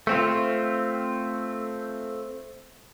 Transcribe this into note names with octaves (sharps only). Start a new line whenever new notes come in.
A3 C4 F4